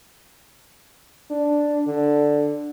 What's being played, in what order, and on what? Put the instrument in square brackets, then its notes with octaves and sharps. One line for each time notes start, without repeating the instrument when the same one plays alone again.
[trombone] D4
D3